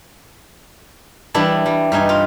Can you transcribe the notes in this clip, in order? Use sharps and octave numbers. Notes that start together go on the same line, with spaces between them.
E3 G3 D4 E4
G3
G2 D#4 G#5
F4